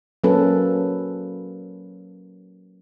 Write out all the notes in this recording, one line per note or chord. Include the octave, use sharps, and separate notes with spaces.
F#3 A#3 C#4 A4 B4